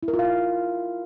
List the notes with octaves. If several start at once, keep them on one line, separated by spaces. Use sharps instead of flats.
E4
A#4
F4
F5
F4